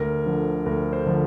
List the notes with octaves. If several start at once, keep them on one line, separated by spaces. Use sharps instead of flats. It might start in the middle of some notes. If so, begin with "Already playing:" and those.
Already playing: D2 A#4
D3 F3
D2 A#4
C5
D3 F3